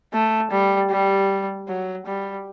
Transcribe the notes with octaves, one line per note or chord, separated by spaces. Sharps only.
A3
G3
G3
F#3
G3